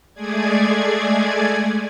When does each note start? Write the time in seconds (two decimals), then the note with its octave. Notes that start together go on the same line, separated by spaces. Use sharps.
0.14 G#3 A3 G#4 D5 G#6